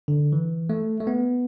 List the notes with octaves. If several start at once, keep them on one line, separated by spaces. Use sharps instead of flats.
D3
E3
A3
A3
B3